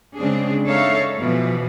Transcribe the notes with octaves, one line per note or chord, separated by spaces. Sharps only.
C#3 G#3 C4 D4 G#4
G#3 D#4 A4 C#5 E5 F5
B2 E3 F3